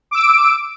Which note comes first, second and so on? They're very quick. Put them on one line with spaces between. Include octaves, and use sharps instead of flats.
D6 E6 D7